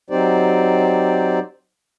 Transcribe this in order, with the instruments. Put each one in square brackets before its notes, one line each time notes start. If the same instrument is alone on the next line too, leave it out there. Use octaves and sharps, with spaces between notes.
[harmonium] F#3 C4 D#4 G4 C5 D5